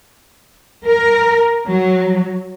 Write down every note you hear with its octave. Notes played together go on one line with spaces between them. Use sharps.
A#4
F#3